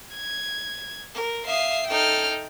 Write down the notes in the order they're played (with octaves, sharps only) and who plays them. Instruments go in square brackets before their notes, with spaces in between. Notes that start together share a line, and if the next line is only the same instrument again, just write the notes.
[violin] G#6
[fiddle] A#4
[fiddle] E5 D#6 [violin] F5 C7
[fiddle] D#4 A4 [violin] G5 F6